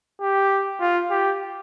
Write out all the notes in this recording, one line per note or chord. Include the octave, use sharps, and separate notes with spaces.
G4
F4
G4